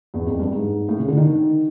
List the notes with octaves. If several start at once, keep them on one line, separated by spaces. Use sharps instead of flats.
E2
F2
G2
G#2
A2
C#3
D3
D#3